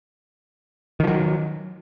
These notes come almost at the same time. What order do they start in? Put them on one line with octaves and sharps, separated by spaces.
D#3 F3 F#3